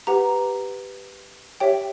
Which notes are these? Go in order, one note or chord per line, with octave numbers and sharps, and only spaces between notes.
G4 B4 F#5 A#5
G4 C#5 E5 G5